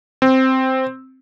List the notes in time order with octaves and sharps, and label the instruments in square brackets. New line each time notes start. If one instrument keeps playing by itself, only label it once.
[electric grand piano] C4